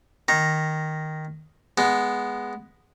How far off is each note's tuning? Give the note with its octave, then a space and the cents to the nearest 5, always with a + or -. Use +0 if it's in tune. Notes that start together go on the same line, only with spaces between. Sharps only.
D#3 +0 A#5 +0
G#3 +0 B3 +0